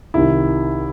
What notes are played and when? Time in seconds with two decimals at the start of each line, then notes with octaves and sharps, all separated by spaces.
0.14 C2 C3 D#3 E4